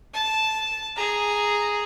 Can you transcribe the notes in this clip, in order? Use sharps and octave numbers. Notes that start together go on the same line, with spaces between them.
A5
G#4 A#5